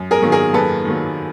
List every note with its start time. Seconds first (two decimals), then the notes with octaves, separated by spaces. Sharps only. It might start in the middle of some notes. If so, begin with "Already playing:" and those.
Already playing: F#2
0.11 G#4 A#4
0.22 D#3 F#3 A#3
0.32 G#4 A#4
0.53 F#2 A4 B4
0.85 D#3 F#3 A#3